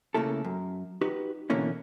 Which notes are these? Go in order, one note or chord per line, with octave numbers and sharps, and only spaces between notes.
C#3 A3 A#3 E4 A4
F#2
D#4 F#4 G4 B4
B2 D3 E3 A#3 C#4 E4